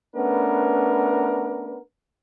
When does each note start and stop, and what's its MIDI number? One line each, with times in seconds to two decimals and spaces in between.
0.14 1.77 57
0.14 1.77 59
0.14 1.77 61
0.14 1.77 62
0.14 1.77 70
0.14 1.77 71